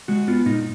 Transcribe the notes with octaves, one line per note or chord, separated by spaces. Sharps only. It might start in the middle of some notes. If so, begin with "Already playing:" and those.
G#3 F#4
B3 F4
A#2 D#4